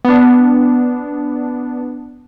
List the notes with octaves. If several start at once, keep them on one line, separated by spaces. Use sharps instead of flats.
B3 D4